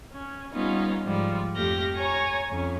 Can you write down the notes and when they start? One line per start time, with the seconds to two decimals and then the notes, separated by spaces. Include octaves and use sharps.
0.13 C#4
0.52 G3 B3 C#4 D#4 F4
1.05 G#2 F3 G3
1.56 F2 A3 G4 F6 G6 A#6
1.96 C#5 G#5 A#5 C#6
2.49 F2 C#4